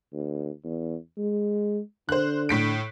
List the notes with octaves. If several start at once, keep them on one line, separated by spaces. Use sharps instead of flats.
D2
E2
G#3
D3 C5 F#6
A2 B6 D7